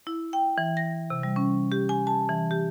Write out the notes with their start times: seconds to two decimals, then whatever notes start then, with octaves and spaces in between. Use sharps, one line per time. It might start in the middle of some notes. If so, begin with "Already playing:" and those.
0.07 E4
0.33 G5
0.58 E3
0.77 A#6
1.10 C3
1.23 G3
1.36 C#4
1.72 G4
1.89 G#5
2.07 A5
2.29 E3
2.51 G4